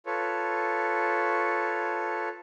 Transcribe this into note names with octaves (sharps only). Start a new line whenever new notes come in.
F4 A4 B4 C#5